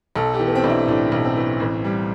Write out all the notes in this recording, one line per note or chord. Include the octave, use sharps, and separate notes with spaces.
B1 A4
G4
E3
B3
C4
B1 D4
E4
A2 D4
B1
C4
E3
A1
G3